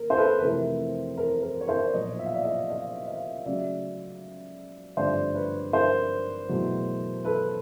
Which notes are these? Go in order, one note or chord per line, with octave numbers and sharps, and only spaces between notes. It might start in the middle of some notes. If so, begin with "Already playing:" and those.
Already playing: A#3 A#4
C5
A4 B4
B4
F2 C3 E3 A3 A#4
A#4
A#4
C#5
A#4 C5
D5
B1 A#2 F3 C#5 D#5
E5
F5
D5 E5
D#5 F5
D#5 F5
D#5 F5
C#2 C#3 F#3 A3 D5 E5
G#1 G2 D3 F3 A3 C5 D5
B4 C#5
A#4 C5
E2 B2 F#3 A3
A4 B4